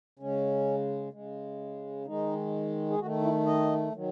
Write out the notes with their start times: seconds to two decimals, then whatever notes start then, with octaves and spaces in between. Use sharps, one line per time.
0.19 C#3 G#3 C#4
1.13 C#3 G#3
2.06 D#3 G#3 D#4
2.90 G#4
2.99 D#3 A3 F#4
3.22 E4
3.46 D#5
3.93 D#3 F#3